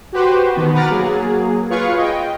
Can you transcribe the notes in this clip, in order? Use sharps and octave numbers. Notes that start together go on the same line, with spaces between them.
F#4 G4 B4 C5
B2 D#3 B3
B4 F#5 A#5 D6 F6 A6
F#3 A#3 G#4
F4 G#4 B4 C#5 F5 C#6
D#5 G5